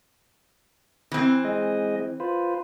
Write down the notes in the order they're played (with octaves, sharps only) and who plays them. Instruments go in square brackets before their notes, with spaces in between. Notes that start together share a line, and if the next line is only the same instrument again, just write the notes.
[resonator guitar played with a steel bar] E3 C4
[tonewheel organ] G#3 D#5
F4 B4 C5